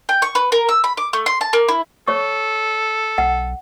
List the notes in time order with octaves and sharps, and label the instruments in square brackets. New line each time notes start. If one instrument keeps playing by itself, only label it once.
[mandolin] G5
C#6
B4
A#4
E6
B5
D6
A3
C6
A5
A#3
E4
[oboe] A4 [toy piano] C#5 C#6
[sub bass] B1 [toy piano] F#5